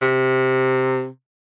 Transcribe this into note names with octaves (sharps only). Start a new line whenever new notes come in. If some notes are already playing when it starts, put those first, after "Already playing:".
C3